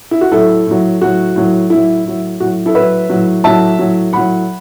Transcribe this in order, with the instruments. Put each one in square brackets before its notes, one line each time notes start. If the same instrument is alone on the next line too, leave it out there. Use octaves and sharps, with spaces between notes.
[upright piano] E4
F#4
A2 F#3 E4 A4
A2 F#3
A2 F#3 F#4
A2 F#3
A2 F#3 E4
A2 F#3
A2 F#4
F#3
E4 A4
A2 F#3 B4 E5
A2 F#3
A2 F#3 E5 A5
A2 F#3
A2 F#3 F#5 B5